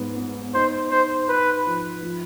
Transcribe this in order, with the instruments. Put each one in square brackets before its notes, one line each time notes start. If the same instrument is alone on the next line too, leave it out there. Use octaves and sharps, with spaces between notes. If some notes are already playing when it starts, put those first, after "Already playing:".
Already playing: [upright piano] G#2 B3
B3
[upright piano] D#4 [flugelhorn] C5
[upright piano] D#4 [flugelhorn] C5
[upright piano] D#4 [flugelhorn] B4
[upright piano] F3
F3